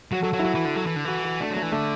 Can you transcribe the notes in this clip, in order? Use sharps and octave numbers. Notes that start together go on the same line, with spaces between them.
F#3 F#4
F#3 A4
F#3 F#4
E4
F#3 F#4
E3
D3
F#3 A4
E3
D3
E3 F#4
F#4
A3 D4
F#3
A3
E3
D3 A3